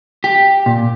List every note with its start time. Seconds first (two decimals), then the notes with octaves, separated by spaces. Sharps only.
0.24 G4
0.66 A#2